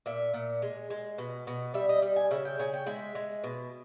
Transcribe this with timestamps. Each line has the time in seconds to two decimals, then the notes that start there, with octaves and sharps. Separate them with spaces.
0.06 A#2 E5
0.34 A#2
0.62 G#3
0.90 G#3
1.18 B2
1.47 B2
1.74 G3 E5
1.89 D#5
2.02 G3
2.16 G#5
2.31 C#3 E5
2.45 G5
2.59 C#3 G#5
2.74 G5
2.86 G#3 E5
3.15 G#3
3.44 B2